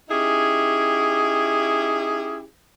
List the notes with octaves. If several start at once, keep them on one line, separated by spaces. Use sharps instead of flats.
C#4 D#4 E4 G4 G#4